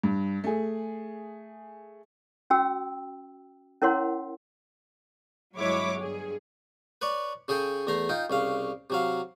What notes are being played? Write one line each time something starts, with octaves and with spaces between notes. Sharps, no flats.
G2
A3 G#4
C#4 F#4 G5 E6
C#4 E4 A#4 C#5 F#5 C6
G1 F#3 G#3 E4 C#5 D6
G2 G#4
B4 C#5 D5
C#3 G#4 A4 G5
E2 A3 A#5 C6
D#4 F4 G5
C2 C#3 F5
C3 F#3 F5